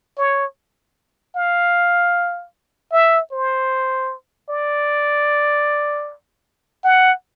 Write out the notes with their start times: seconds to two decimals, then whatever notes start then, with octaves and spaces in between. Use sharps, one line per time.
0.18 C#5
1.36 F5
2.92 E5
3.32 C5
4.49 D5
6.84 F#5